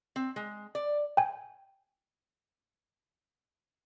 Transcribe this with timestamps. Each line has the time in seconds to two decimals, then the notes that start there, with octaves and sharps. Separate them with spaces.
0.16 C4
0.36 G#3
0.75 D5
1.17 G5 G#5